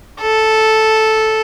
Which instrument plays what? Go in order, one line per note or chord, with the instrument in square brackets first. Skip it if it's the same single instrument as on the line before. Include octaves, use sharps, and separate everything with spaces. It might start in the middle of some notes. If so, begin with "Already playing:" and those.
[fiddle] A4